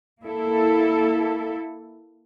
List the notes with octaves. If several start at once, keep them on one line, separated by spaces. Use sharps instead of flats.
A#3 E4 A4